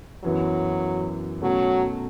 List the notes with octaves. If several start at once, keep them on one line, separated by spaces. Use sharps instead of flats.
F#2 E3 F#3 B3
B2 F#3 A3 C#4